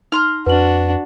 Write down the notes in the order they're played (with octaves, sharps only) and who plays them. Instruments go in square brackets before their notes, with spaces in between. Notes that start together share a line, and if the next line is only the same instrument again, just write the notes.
[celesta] D#4 [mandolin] A#5 C6 F6
[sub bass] F2 [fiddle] D4 F#4 [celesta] B4 F#7